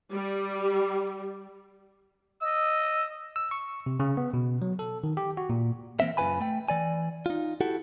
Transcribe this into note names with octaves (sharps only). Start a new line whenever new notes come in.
G3
D#5 E6
E6
C#6
C3
C#3
B3
B2
F#3
A4
D#3
G4
F#4
A#2
E3 A#3 C4 E5
F#2 C#3 F4 B4 G#5 B5
A3 G5
E3 D5 G#5
D#4 F4
E4 F#4 G4 A4 F#5